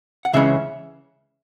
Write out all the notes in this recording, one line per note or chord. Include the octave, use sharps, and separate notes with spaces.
F#5
C#2 C#3 E3 G#3 C#4 E5